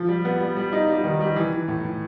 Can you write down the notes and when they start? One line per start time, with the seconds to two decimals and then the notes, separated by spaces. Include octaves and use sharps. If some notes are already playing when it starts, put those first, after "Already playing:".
Already playing: F3
0.09 G3
0.25 B3
0.41 G3
0.57 G3
0.73 D#4
0.89 G3
1.04 D#3
1.21 G3
1.36 E3
1.53 E3
1.68 A2
1.85 E3